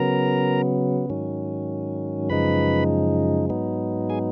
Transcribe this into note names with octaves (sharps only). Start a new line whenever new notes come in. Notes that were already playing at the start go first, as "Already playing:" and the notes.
Already playing: C#3 F#3 B3 A#4 A#5
G#2 D#3 F#3 C#4
F#2 C#3 F3 G#3 D#4 B4 B5
G#2 F#3 B3 D#4
G#4 G#5